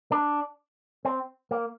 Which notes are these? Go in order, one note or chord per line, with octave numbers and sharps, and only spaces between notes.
D4
C4
A#3